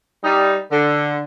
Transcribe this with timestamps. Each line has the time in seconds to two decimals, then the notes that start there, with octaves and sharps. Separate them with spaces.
0.23 G3 D#4
0.71 D3